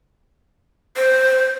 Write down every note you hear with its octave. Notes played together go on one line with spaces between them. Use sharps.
C5